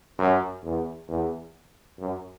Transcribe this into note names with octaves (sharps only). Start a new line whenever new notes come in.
F#2
E2
E2
F#2